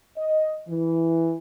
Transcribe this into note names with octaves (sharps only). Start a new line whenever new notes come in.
D#5
E3